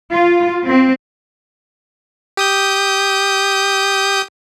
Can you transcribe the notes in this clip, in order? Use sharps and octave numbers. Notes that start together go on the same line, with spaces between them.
F4
C4
G4 D#6 G6